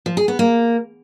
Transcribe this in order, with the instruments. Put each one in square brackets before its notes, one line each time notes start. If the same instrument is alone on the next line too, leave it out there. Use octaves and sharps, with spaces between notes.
[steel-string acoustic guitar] F3
G#4
B3
A#3